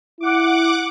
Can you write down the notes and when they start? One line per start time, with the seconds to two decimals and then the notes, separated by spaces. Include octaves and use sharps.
0.20 E4 F#5 D6